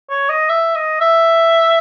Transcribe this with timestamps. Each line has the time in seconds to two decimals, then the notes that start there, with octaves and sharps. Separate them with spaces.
0.10 C#5
0.29 D#5
0.50 E5
0.75 D#5
1.01 E5